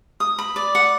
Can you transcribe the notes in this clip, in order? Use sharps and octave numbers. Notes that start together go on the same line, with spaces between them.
D#6
B5
D5
F#5